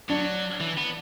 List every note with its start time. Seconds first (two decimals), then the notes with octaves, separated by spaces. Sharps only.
0.09 F#3 D4
0.60 E3
0.78 B3